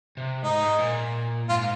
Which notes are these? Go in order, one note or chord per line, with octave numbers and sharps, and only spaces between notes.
C3
G#2 D#4
G#2
A#2
G#2 F4